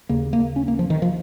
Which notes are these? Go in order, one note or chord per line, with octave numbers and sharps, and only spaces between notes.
D#2 C#3 A#3
A#3
C#4
A#3
F3
D#3
F3